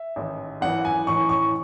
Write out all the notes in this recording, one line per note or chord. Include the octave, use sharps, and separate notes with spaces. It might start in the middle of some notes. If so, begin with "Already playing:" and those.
Already playing: E5
A1 G#2 D#3
G#1 F#2 E3 F#5
G#5
A1 A2 E3 C#6
C#6